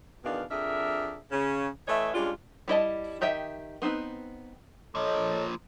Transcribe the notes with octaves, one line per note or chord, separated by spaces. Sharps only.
E2 B2 D#3 B3 D4 F5
F2 D4 G#4 A#4 E5
C#3 C#4
E3 A3 B4 C#5 D#5 E5
G3 G#3 C#4 D4 F4
G3 E4 D#5 A5
D#3 G4 D#5 E5 G5
B3 C4 D#4 B4
A#2 F3 A4 C#5 D#5